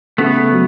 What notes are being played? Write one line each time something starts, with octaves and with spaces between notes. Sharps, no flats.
C#3 A3 B3
F#3